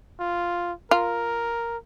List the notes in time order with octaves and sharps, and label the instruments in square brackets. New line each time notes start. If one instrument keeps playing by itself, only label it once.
[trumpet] F4
[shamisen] F4 [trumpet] A#4